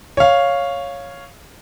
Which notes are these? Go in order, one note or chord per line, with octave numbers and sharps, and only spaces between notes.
C#5 F5